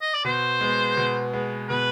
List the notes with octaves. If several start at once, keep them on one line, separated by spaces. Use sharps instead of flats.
D#5
D5
B2 C5
G#3 B3
B2
G#3 B3
B2 B4